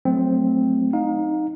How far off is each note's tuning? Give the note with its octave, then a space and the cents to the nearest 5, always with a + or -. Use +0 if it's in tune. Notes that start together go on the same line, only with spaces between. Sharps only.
F#3 +0 A3 +0 C4 +0
D#4 +0 F5 +35